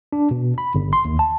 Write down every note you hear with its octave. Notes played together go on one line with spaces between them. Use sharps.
D4
B2
B5
G1
C6
D#2
A5